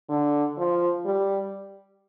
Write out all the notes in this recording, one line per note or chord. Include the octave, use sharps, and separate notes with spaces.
D3
F3
G3